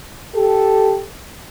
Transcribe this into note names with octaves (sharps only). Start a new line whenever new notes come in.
G4 A4